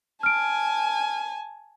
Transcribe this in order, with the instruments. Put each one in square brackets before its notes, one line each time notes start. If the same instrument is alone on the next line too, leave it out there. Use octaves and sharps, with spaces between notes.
[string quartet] G#5 A5 [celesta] F6 D7